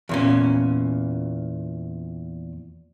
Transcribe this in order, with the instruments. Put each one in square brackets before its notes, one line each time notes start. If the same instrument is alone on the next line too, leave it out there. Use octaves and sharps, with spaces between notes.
[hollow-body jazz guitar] E2 A#2 C#4